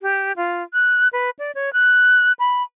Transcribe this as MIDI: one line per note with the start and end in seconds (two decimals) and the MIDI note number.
0.02 0.32 67
0.36 0.63 65
0.73 1.08 90
1.13 1.30 71
1.39 1.51 74
1.55 1.73 73
1.73 2.32 90
2.39 2.63 83